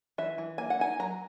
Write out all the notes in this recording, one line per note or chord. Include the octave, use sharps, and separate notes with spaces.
E3 E5
E3
A#3 G#5
F#5
D#4 G#5
F#3 A#5